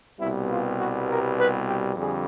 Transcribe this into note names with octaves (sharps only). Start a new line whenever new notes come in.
C2 B2 G3 B3 E4
F4
F#4
A#4
B4
G4
F2 D3 G3 G#4